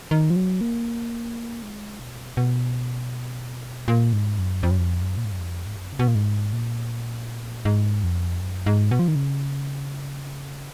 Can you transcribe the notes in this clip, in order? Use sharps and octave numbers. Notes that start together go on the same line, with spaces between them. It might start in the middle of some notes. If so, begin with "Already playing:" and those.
D#3
F3
F#3
A#3
G#3
B2
B2
A#2
G#2
F#2
F2
F#2
F2
F#2
A#2
G#2
F#2
F2
G#2
F#2
C#3
B2
A#2
G#2
A#2
G#2
F2
F#2
G#2
B2
F3
D#3
C#3